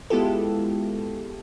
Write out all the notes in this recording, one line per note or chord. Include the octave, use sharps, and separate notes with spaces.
G#3 B3 E4 F4 G4 A4